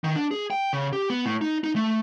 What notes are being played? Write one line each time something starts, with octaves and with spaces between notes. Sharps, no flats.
D#3
D4
G#4
G5
C#3
G4
B3
A2
D#4
D#4
A3